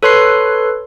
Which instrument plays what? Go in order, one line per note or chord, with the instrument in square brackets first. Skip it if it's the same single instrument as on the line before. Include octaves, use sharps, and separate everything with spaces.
[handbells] A4 B4 C#5 C6 F#6 C7